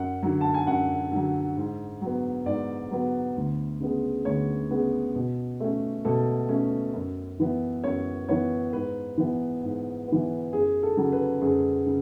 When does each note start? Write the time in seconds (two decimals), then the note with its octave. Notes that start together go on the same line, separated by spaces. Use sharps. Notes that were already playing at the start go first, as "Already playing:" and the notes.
Already playing: F#2 F#5
0.23 D3 F#3
0.41 A5
0.54 G#5
0.67 F#2 F#5
1.12 D3 F#3
1.57 G#2
2.01 F#3 B3
2.46 G#2 D5
2.91 F#3 B3
3.36 D2
3.80 C#3 G#3 B3
4.25 D2 C#5
4.70 C#3 G#3 B3
5.15 B2
5.60 A3 C#4
6.05 B2 A4
6.49 A3 C#4
6.94 F#2
7.40 E3 B3
7.84 F#2 C#5
8.29 E3 B3 C#5
8.73 G#2 B4
9.18 E3 B3
9.63 G#2
10.07 E3 B3
10.52 F#2 G#4
10.83 A4
10.97 C#3 F#3
11.12 B4
11.41 F#2 G#4
11.86 C#3